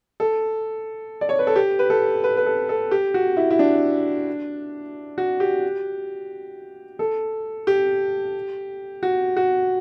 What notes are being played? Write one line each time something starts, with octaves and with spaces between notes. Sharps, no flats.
A4
D5
C#5
B4
A4
G4
B4
A4
B4
B4
A4
A4
G4
F#4
E4
E4
D4
F#4
G4
A4
G4
F#4
F#4